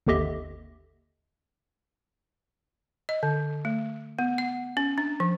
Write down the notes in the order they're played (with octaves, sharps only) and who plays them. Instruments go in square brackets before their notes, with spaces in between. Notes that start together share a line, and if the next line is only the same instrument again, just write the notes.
[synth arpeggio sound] G#1 D#2 D3 G4 D#5 E5
[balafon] D#5
D3
A3
B3
F#5
C#4
D4
F3